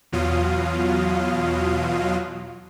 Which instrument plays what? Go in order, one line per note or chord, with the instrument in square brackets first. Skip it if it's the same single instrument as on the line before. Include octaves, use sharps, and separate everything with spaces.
[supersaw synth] E2 B2 F#3 F4 F5 D#6